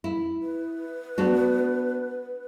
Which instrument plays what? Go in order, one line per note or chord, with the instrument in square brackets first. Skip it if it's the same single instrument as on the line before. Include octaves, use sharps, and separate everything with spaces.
[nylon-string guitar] E4
[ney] B4
[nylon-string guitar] B3 D4 F#4